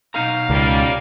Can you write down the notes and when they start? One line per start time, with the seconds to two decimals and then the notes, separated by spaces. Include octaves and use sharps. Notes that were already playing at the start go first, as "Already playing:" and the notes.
0.14 B2 D#4 F5 A#5
0.50 C#2 G3 A#3